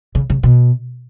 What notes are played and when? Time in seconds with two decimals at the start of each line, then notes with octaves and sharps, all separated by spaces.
0.15 C#3
0.30 C#3
0.43 B2